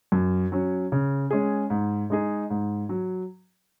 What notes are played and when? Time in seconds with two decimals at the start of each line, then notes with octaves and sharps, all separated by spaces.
0.12 F#2
0.52 F#3 C#4
0.92 C#3
1.31 G#3 C#4 G#4
1.70 G#2
2.10 G#3 D#4 G#4
2.50 G#2
2.89 F#3